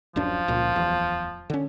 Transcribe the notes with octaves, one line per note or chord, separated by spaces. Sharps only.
D1 F#2 F3 D4
C#2 A#2
D1 E2
D3 C#4